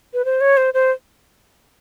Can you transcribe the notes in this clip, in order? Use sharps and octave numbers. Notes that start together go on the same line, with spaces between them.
B4
C5
C#5
C5
C5